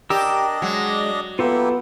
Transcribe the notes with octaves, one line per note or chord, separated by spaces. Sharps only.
D4 G4 A#4 D5 D#5 E6
F#3 G#3
A#3 B3 E4 F4 G4 A4